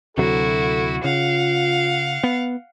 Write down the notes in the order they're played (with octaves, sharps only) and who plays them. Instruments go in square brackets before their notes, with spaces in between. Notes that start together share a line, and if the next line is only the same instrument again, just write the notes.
[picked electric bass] D2 C3 F#3 [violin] E4 F#4 [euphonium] A4
[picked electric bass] C#3 [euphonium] F4 [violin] F5 F#5
[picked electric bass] B3